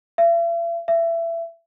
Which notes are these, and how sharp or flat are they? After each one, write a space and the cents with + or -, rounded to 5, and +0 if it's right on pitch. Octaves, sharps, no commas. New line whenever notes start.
E5 +45
E5 +25